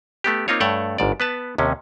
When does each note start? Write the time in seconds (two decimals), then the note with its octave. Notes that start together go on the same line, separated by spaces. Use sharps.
0.24 A3 B3 G4
0.48 A#3 C4 D#4 F4 C#5
0.60 G2 A3 C#5 F#5 G5
0.98 G1 G#2 D5
1.20 B3 B4 A5
1.58 D#2 C3 C#4